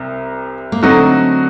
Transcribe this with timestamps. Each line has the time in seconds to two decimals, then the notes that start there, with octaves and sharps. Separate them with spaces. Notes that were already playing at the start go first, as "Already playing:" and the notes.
Already playing: C2 C3
0.72 A#3
0.83 D3 F#3 A3 C4 D#4 F#4